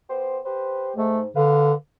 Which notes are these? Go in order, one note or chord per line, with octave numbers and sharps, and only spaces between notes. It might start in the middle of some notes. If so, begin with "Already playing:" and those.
B3 G4 C5
G4 B4 C5
G#2 A3
D3 B4 F5